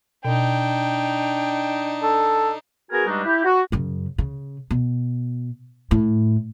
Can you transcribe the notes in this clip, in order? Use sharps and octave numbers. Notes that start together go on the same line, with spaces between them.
B2 D4 D#4 G5
A4
B3 F#4 G#4 A#4 G#5
G2 G3 G#3 D4 D#4 F#4
E4 G4
F#4
F#2 C#3
C#3
B2
A2